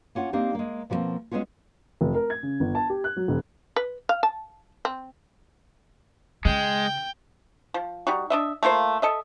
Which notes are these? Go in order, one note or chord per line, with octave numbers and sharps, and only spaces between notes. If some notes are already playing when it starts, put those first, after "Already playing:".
A#3 C#4 F4 F#5
A#3 C4 D4 D#4 G4
G#3 A#3
B2 F3 G3 G#3 A#3 C4
G#3 A#3 B3 C#4 F4
F1
A#4
G#6
C#3
G1
A5
G4
F#6
F#3
E1
B4
F5
A5
C4
C#3 G#3 G5
F3
G3 D#4 F#4
D4 D#5 E5
A3 A#3 F4 C5
A4 D#5 E5